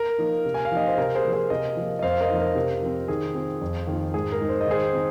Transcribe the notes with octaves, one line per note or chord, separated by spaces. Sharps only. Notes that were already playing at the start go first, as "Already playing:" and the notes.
Already playing: A#4
F3 A#3 D#4
C3
G#5
F5
F3 A#3 D#4 D#5
C5
C3 A#4
G#4 C5
F3 A#3
G#4 C5
C3 A#4 D#5
F3 A#3
D#5
F2 C5 F5
A#4 D#5
F3 A#3 D#4
A#4
C3
F3 C4
D#3 G#4
C4 F4
F2
D#3 A#3 F4
G#2 G#4
A#4
G#3 D#4
C5
D#5
D#3 G#4 C5
C4 D#4